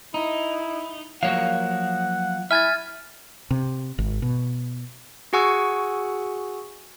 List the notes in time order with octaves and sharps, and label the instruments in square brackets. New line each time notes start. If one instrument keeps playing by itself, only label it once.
[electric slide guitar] D#4 [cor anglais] E4
[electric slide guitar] F3 A#3 F#4 [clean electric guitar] F#3 C#5 F5 [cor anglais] F#5
[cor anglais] E4 [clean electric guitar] E5 G#5 [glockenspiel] F6 G#6 A6
[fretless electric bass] C3
G#1
B2
[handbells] F#4 G#4 F#5 G#5 C#6 E6